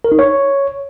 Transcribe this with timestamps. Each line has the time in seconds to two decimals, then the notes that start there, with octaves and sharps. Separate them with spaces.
0.04 A#4
0.12 D#4
0.19 C#5